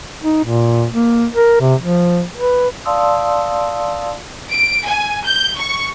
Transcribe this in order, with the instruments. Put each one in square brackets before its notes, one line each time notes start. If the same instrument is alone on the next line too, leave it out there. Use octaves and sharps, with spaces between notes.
[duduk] D#4
A#2
A#3
A#4
C3
F3
B4
[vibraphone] D5 F5 A5 C6 D#6 E6
[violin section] D7
G#5
G6
C#6